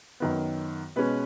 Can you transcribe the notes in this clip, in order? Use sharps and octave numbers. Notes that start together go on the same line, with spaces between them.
F#2 D#3 B3
B2 G#3 C#4 B4